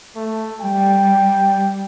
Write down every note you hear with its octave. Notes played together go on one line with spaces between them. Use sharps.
A3
G3 G5